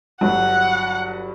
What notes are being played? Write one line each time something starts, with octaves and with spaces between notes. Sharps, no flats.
G1 G2 F#3 F#5